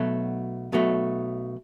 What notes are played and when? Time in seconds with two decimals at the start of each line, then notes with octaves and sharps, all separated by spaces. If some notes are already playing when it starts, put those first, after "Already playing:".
Already playing: B1 B2 F#3 A3
0.72 B1 B2 F#3 A3